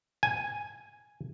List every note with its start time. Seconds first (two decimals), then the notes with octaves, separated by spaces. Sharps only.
0.23 G#5